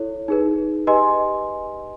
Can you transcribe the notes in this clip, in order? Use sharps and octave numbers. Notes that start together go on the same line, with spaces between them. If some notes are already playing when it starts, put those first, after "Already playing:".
Already playing: E4 A4 C#5
D#4 G#4 B4
G4 B4 D#5 G#5 C6